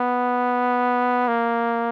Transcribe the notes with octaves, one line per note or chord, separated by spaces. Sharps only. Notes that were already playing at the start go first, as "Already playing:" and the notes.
Already playing: B3
A#3